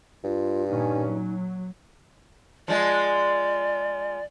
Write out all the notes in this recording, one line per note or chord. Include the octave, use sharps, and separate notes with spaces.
G2 F4
A#2 D#3 C#4 D#4
F#3
F3 G#3 D5